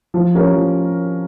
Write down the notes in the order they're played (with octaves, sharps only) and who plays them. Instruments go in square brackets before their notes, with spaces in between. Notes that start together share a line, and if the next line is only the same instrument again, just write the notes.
[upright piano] F3
C#4 G4 A#4
F3